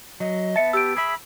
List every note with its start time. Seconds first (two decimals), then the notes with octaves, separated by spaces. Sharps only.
0.20 F#3 D#5
0.56 B3 E5 A5 C#7
0.73 G4 E6 D7
0.96 G#4 E5 B5